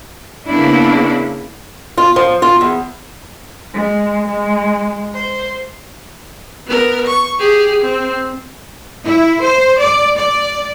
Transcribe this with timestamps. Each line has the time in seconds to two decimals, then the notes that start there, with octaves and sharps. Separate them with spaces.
0.46 C#3 A#3 B3 D4 E4
1.98 F4
2.16 F3
2.42 F4
2.61 E2
3.74 G#3
4.28 G#3
5.13 C5
6.67 B3 A#4
7.07 C#6
7.39 G4 G#4
7.81 C4
9.04 E4
9.42 C5
9.78 D5
10.16 D5